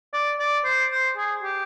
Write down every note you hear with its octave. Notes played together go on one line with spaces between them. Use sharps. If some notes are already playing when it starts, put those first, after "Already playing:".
D5
D5
C5
C5
G#4
G4